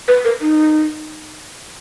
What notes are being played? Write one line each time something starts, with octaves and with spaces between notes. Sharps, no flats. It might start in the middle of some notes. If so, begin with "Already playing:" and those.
B4
A#4
D#4